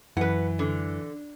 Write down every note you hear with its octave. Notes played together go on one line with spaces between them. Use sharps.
F#2 E3 B4 F#5
D3